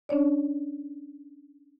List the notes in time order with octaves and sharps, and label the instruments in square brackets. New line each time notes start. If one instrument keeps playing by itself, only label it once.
[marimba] C#4 D4 C#5 D5